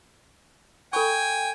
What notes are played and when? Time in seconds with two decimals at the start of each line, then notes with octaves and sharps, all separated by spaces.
0.93 A4 G5 G#5 B5 C#6